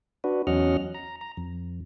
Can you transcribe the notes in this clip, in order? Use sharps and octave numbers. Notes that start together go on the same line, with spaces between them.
D4 F#4 B4
E2 F#3 C#4 D#5 F#5 F6
A#5
A#5
F2